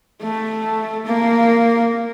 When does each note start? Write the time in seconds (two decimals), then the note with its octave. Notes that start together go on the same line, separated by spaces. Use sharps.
0.22 A3
1.05 A#3